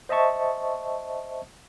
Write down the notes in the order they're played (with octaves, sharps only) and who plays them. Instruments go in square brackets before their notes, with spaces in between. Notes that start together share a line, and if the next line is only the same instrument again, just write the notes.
[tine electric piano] C5 D#5 E5 A5 C#6